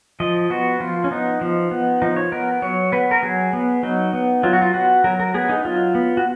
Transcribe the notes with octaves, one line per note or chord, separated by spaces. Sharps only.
F3 D#5
B3 F#4
F3 F4
C#4
B3 D#4
F3
B3
F3 D#4
C#5
B3 A#4
F#3 C#5
B3 B4
A#4
F#3 G#4
B3
F#3 D#4
B3
F#3 F4
F#4
F4
B3 F#4
F#3 A#4
A#4
B3 G#4
D#4
F#3 F4
B3
F#4